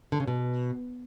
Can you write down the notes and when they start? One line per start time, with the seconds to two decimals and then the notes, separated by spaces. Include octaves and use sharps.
0.12 D3
0.20 C#3
0.28 B2